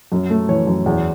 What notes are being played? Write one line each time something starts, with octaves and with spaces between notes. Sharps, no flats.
F#2
A3
E3 C#5
F#2
E2